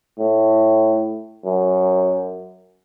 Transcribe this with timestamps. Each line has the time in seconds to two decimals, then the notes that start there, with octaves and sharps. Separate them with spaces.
0.19 A2
1.45 F#2